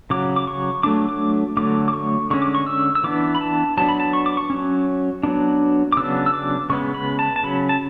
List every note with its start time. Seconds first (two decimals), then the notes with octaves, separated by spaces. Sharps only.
0.10 C#3 F#3 D6
0.36 D6
0.47 C#6
0.83 F#3 A3 D4 D6
1.09 D6
1.57 D3 F#3 A3 D6
1.88 D6
1.93 C#6
2.30 D3 G#3 C#4 C#6
2.42 D6
2.55 C#6
2.67 E6
2.95 E6
3.04 E3 B3 D4 D6
3.35 B5
3.41 A5
3.77 F#3 B3 D4 A5
3.89 B5
4.00 A5
4.13 C#6
4.26 D6
4.37 C#6
4.50 F#3 C#4
5.23 F#3 B3 D4
5.92 D6
5.97 C#3 F#3 B3 D4 E6
6.26 E6
6.34 D6
6.70 C#3 G#3 B3 C#6
6.94 B5
7.19 A5
7.36 A5
7.43 C#3 F#3 C#4 B5
7.69 A5